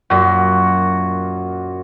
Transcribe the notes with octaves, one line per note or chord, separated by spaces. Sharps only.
F#2 A#2 F#4